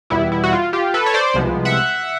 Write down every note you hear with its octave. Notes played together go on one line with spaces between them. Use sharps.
E2 B2 G3 B3 E4
E4
F#4
F4
F4 G4
A4 B4
C#5
C5 D5
C2 C3 F3 G#3 B3
E5 F#5